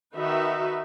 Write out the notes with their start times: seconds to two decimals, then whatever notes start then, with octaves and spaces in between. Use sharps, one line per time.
0.16 D#3 D#4 F#4 B4 E5